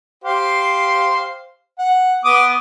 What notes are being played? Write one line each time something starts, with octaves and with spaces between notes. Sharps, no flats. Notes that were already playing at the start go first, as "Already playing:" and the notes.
G4 C5 F5
F#5
B3 D6 D#6